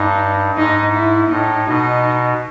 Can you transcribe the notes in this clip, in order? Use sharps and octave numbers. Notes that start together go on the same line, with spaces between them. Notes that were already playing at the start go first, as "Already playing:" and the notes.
Already playing: G2 D#4
G#2 D#4
E4
A2 D#4
B2 D#4